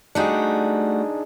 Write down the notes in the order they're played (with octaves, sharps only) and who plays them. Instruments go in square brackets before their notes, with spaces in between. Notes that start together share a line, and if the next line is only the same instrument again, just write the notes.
[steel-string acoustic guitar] G3 A3 F#4 [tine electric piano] D4 D#4 G#4